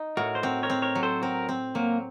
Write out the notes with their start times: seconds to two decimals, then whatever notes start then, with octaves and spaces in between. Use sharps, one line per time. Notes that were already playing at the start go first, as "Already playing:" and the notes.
Already playing: D#4
0.17 A2 F#4 A#4
0.35 C5
0.43 C4 F#4 A#4
0.63 A#4 C#5
0.70 C4
0.82 A#4 C#5
0.95 F#3
1.03 A4 C5
1.22 C4 F#4 A#4
1.49 C4
1.75 F#3 A#3